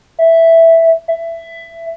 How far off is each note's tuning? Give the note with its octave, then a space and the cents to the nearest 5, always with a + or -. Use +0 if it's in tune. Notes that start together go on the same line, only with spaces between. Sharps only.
E5 +0
E5 +15